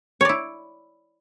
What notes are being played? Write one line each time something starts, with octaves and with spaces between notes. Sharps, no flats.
E4 C#5 D5